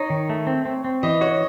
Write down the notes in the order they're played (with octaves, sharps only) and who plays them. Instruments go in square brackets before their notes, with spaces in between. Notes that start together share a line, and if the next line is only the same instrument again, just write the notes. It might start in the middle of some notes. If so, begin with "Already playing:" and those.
Already playing: [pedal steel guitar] D#4 [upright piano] C#5
[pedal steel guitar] D#3
A3
C4
C4
C4
[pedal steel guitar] E3 [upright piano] D#5
[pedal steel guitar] F#4 [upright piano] C#5